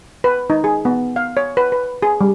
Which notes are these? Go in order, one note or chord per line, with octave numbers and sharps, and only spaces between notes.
B4
D#4
G#4
B3
F5
C#5
B4
B4
G#4
G3